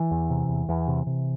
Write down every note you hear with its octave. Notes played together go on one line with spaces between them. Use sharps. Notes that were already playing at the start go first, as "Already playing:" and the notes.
Already playing: E3
E2
C3
E2
E2
C3
C3